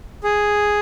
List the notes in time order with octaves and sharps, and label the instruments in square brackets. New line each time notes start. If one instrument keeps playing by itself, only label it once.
[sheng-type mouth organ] G#4